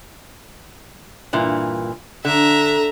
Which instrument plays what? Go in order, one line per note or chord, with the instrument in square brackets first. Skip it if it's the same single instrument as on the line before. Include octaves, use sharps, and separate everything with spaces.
[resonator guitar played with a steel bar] G2 A#2 E3
[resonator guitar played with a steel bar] D3 [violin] E5 A#5